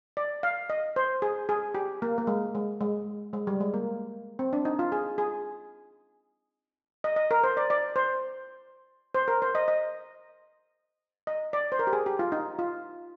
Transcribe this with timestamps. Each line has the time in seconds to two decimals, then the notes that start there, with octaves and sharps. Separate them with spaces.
0.17 D5
0.43 F5
0.70 D#5
0.96 C5
1.22 G#4
1.49 G#4
1.75 G4
2.02 A#3
2.18 A#3
2.27 G#3
2.55 G#3
2.81 G#3
3.33 G#3
3.47 G3
3.60 G#3
3.74 A#3
4.39 C4
4.53 D4
4.65 D#4
4.79 F4
4.92 G#4
5.18 G#4
7.04 D#5
7.16 D#5
7.31 A#4
7.44 C5
7.57 D5
7.70 D5
7.96 C5
9.15 C5
9.28 A#4
9.42 C5
9.55 D#5
9.68 D#5
11.27 D#5
11.53 D5
11.72 C5
11.79 A#4
11.87 G4
11.93 G#4
12.06 G4
12.19 F4
12.32 D#4
12.59 F4